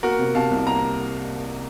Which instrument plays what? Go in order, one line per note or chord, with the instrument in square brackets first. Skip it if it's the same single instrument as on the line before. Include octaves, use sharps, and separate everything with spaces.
[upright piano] A#3 [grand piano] F#4 A#4
[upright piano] C3
[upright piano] C3 [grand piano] F5 A5
[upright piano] C2
[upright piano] A#3 [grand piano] A#5